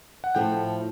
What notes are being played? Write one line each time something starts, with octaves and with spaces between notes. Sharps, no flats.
F#5
A2 F3 A3 G5